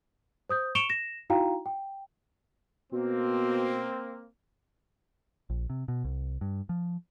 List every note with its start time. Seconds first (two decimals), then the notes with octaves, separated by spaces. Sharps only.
0.49 C5 D#6 G6
0.75 C#6 C#7 D7 E7 F7 G7
0.89 A#6 E7
1.30 D#4 E4 F#4 F5 G5 A#5
1.66 G5
2.93 B2 A#3 C4
5.50 A#1
5.70 C3
5.88 B2
6.04 C2
6.41 G2
6.69 F3